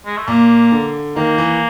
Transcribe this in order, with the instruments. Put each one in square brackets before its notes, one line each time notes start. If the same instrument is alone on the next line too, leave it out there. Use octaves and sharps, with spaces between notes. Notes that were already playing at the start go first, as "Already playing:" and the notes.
[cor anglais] G#3
A3
[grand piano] A#2 [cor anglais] A#3
[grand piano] D3
[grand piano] D#3 [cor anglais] A#3
[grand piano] E3